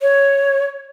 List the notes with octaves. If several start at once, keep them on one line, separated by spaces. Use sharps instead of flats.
C#5